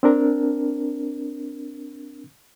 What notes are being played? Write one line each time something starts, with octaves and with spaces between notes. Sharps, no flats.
C4 D4 A#4